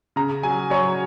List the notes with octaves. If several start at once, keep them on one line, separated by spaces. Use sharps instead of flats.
C#3 A#5
F#3 G#5
F#3 C#5